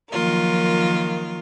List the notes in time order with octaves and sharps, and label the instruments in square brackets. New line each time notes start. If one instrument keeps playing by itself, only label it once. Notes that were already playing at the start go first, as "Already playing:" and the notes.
[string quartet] D#3 F3 F#3 A#3 F4 A#4